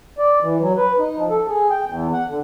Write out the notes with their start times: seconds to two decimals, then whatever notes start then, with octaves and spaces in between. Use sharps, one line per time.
0.18 D5
0.42 E3
0.60 F#3
0.77 B4
0.99 D#4
1.16 F3
1.30 A4
1.48 G#4
1.70 G5
1.86 E2
2.13 F#5
2.28 D3